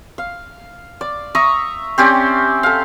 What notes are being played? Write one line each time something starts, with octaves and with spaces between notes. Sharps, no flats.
F5
D5
E5 A#5 C#6 D#6
C4 C#4 G4 D5
A4 F5